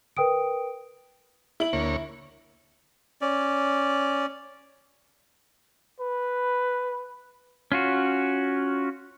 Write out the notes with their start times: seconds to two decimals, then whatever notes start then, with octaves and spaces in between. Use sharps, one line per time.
0.17 A#4 B4 G5 D#6 D7
1.60 E4 F#7
1.73 D2 A#3 C#5
3.21 C#4 D5
6.00 B4
7.72 C#4 F4 F#4